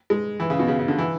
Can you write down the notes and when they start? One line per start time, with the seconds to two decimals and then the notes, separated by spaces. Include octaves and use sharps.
0.10 G#3
0.40 E3
0.50 C#3
0.59 B2
0.68 C#3
0.79 C#3
0.88 D3
0.98 E3